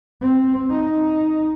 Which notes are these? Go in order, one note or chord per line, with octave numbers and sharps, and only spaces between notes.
C4
D#4